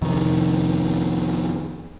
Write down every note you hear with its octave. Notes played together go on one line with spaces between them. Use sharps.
F2 C3 D#3